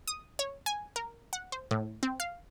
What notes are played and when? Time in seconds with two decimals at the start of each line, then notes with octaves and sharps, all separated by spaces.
0.08 D#6
0.39 C#5
0.66 G#5
0.96 A#4
1.33 F#5
1.52 C5
1.71 A2
2.03 C4
2.20 F5